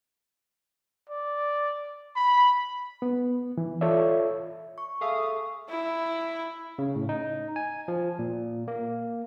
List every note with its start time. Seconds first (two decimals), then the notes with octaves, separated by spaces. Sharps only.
1.09 D5
2.16 B5
3.02 B3
3.58 E3
3.81 F4 A4 C#5 D5 E5
4.78 C#6
5.01 G#4 A4 E5 F5 D#6
5.69 E4
6.79 C#3
6.96 A2
7.09 D#4
7.56 G#5
7.88 F3
8.19 A#2
8.68 A#3